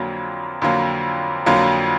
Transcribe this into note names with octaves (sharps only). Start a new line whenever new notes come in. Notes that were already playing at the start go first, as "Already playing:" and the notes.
Already playing: F2 D3 F#3 A#3
F2 D3 F#3 A#3
F2 D3 F#3 A#3